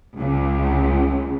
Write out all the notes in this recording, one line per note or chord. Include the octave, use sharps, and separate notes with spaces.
C#2